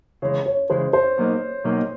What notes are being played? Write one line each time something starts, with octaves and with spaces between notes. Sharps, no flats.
C#3 E3 G#3 C#5
C#5
C#3 E3 G#3 C5
C5
B1 B2 F#3 A#3 D#4
B1 B2 F#3 A#3 D#4